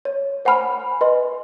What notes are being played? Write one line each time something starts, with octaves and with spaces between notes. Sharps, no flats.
C#5
C5 F#5 G#5 B5 F6
B4 D#5 C6